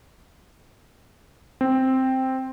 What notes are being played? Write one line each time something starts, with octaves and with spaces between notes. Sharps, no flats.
C4